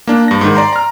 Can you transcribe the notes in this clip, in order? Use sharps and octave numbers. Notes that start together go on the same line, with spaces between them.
A#3 D4
G2 A#6
G#2 D#3
D5 A#5 C6
A#5 F6